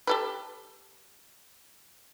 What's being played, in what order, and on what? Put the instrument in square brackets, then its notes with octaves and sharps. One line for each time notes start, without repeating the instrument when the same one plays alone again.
[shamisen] G4 A4 B4